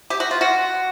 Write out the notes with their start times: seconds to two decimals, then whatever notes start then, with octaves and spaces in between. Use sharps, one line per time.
0.10 G4
0.20 F#4
0.31 F4
0.41 F#4